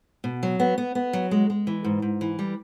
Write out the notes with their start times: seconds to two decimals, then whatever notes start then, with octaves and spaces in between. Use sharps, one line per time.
0.24 B2
0.43 F#3
0.60 B3
0.78 B3
0.95 B3
1.13 F#3
1.31 G#3
1.50 G#3
1.67 E3
1.84 G#2
2.02 G#2
2.21 E3
2.39 G3